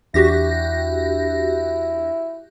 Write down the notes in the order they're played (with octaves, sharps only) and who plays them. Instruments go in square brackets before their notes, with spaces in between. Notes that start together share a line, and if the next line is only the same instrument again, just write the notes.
[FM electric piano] E2 D4 [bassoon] E4 [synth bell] F#4 G4 A#6